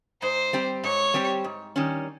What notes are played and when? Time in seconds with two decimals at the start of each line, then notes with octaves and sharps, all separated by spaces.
0.22 G#2 C5
0.53 G3 C4 G4
0.84 G#2 C#5
1.14 G3 C4 G4
1.44 G#2
1.76 D#3 G3 C#4